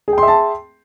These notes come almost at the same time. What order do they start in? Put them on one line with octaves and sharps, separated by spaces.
G#4 G5 C6 E5 A5